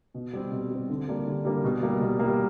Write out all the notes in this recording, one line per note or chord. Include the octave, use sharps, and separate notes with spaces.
B2
G3 C4
B2
G3 C4
D3
G3 A#3 D4
D3
G3 A#3 D4
B2
G3 A#3
B2
G3 A#3